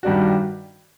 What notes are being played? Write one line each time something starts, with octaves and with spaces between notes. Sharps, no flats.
G2 D#3 G3 D4 F#4